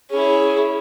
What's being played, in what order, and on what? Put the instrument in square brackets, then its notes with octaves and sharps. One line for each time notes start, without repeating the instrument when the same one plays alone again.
[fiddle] C#4 E4 [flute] G#4